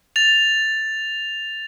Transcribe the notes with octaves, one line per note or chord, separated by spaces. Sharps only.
A6 F7